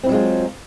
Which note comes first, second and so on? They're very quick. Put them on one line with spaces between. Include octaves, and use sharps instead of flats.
C4 E4 F#3 G#3 F4